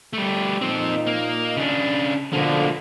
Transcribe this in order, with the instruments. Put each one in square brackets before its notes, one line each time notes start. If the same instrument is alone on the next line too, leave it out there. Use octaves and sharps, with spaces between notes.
[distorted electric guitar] G3 A3
[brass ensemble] A#2 D#4 [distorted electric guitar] F3 C4
[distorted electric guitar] A#3
C#3 D4
[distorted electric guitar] B2 A#3 [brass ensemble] D3 F3